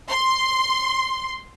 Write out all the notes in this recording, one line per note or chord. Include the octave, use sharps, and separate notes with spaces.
C6